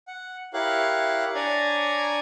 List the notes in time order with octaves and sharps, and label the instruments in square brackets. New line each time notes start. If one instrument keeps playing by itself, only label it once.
[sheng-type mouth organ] F#5
E4 G4 A#4 C#5 F5 F#6
D4 C#5 D5 G#5 A#5